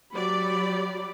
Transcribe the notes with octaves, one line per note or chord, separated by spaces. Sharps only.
F#3 G4 D5 B5